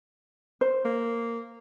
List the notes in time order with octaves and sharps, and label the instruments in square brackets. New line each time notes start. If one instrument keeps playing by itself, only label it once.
[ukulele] C5
[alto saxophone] A#3